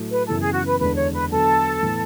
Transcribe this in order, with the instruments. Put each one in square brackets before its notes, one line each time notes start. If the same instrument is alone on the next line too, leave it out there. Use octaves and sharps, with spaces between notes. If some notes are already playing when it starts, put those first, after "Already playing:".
Already playing: [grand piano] A2 F#3 A3 E4
[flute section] B4
[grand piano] F#2 C#3 E3 B3 E4 [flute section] A4
[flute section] G#4
F#4
B4
[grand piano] E2 D3 G#3 D4 [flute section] B4
[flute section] C#5
B4
[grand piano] D3 F#3 B3 [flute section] A4
[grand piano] A2 E3 B3